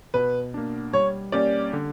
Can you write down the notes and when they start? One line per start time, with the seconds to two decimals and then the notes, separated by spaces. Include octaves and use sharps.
0.14 B2 B4
0.54 A#3 D4
0.93 G3 C#5
1.32 A#3 C#4 G4 D5
1.73 D3